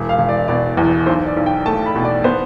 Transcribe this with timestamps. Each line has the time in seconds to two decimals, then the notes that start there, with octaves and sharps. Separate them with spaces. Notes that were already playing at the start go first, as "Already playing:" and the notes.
Already playing: E1
0.09 F5
0.18 E1
0.29 D5
0.48 B2 D5
0.77 E2
1.06 B1 C5
1.26 D5
1.37 B1
1.46 G5
1.66 A3 A5
1.86 B5
1.96 B2
2.05 D5
2.24 B3 C5